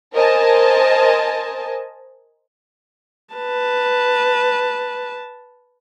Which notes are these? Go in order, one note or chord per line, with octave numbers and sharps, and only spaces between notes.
A#4 C5 D#5 G#5 A5
B4 A5